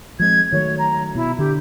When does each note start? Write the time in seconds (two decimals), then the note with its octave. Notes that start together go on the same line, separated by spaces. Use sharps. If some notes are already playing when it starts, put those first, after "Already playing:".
0.20 F3 G#3 C4 G#6
0.52 D#3 F#3 A3 C#5
0.79 A#5
1.15 B2 E4
1.39 D3 G4